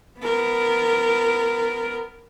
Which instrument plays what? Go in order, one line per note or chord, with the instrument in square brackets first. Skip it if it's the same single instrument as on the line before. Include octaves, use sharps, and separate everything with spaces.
[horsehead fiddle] B3 A#4